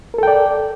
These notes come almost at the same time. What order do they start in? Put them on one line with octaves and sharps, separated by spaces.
A#4 A4 G5 D5